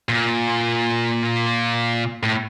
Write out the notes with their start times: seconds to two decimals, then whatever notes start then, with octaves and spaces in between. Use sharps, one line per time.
0.09 A#2
2.23 A2